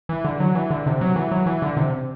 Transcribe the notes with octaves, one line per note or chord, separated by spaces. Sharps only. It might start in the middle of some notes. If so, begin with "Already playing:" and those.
E3
D3
F#3
E3
D3
C3
F#3
E3
F#3
E3
D3
C3